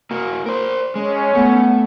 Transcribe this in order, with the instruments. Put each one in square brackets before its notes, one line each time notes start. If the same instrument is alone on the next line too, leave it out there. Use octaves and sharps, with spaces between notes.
[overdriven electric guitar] A#3 F#4
A#4 C5
[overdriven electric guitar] G#3 [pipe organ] C#4
[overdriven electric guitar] A3 [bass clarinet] B3